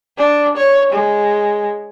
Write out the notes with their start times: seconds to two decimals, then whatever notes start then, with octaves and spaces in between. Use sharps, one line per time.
0.18 D4
0.57 C#5
0.92 G#3